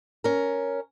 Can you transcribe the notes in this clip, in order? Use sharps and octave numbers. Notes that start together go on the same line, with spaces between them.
C#4 A#4